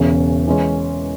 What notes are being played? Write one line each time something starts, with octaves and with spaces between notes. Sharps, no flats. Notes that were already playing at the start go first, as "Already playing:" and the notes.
Already playing: E1 E2 C#3 E3 C#4
E3 G#3 C#4